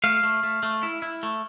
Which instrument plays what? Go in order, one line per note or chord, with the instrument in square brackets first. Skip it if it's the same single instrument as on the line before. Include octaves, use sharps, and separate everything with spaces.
[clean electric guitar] A3 F5
A3
A3
A3
E4
E4
A3